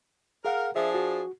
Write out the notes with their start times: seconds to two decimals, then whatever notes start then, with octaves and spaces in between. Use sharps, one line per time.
0.45 G#4 A#4 F5 F#5
0.76 F3 D4 G#4 E5
0.95 F#4